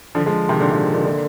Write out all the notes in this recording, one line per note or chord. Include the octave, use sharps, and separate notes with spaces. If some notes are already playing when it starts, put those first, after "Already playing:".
D3 F3
F3 G#3
C3 D#3
A#2 D3
G#2 C3
A#2 D3
A#2 D3